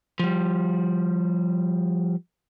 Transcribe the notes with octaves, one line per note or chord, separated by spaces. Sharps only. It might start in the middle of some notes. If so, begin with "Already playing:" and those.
F3 G3